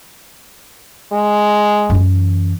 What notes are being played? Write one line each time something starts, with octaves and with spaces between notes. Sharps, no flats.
G#3
F#2 E3